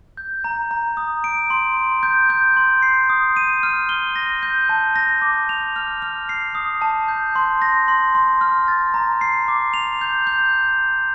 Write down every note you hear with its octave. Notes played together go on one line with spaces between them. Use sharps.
G6
A#5
A#5
D#6
D7
C6
C6
G6
G6
C6
C7
D#6
D#7
F6
G7
A#6
G6
A5
A#6
D6
F7
F6
F6
C7
D#6
A5
G6
C6
A#6
C6
C6
F6
A6
A#5
C7
D6
F7
G6
G6